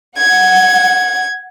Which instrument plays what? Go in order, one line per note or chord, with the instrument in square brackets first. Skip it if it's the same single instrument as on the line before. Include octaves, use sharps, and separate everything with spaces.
[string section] F#5 [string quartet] G#6